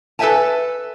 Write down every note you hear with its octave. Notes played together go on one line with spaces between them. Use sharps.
A4 B4 C5 E5 G#5 A5